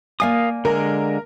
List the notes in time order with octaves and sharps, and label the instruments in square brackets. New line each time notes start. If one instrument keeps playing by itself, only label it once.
[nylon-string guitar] A#3 D5 G#5 [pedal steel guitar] A#4 F5 D#6
[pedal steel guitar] D3 G#3 [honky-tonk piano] A#4